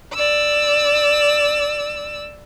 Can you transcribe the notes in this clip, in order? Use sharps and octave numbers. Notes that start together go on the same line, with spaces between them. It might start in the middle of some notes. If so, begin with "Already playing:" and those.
D5 E6